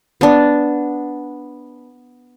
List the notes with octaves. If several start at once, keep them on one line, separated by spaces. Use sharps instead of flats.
B3 D4